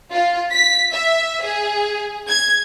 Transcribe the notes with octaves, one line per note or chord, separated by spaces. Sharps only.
F4
B6
E5
G#4
G#6